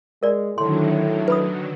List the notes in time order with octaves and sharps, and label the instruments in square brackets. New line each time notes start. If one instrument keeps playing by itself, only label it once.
[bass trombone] G#3 [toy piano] A#4 D5
[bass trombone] A2 [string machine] D3 D#3 F#3 [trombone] A3 [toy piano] C6
[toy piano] B4 B5 D#6